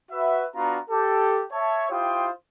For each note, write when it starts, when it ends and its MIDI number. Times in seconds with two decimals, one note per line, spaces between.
0.11 0.44 66
0.11 0.44 71
0.11 0.44 76
0.55 0.77 59
0.55 0.77 62
0.55 0.77 65
0.55 0.77 66
0.55 0.77 82
0.90 1.43 67
0.90 1.43 69
1.52 1.85 73
1.52 1.85 76
1.52 1.85 81
1.91 2.28 64
1.91 2.28 65
1.91 2.28 67
1.91 2.28 72
1.91 2.28 79
1.91 2.28 87